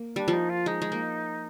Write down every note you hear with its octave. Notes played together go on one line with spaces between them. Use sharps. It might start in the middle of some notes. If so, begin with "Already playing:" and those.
Already playing: A#3
G3 D4
F3 D#4
F4
G#3 D#4
G#3
A#3